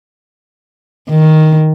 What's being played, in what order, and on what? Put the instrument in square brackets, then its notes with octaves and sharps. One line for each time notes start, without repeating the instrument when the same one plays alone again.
[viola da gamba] D#3